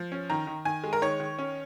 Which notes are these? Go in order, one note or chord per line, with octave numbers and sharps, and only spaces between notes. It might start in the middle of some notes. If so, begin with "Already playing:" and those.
Already playing: F3
C#4
D#3 A#5
D#3
D#3 G#5
G#3
A#4
D#3 C#5
D#3
C#4